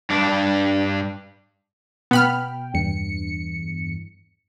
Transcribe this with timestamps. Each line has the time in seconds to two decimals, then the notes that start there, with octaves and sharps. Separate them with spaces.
0.10 G2 D4
2.11 B2 B3 G5 B5 F6
2.74 E2 G2 C#7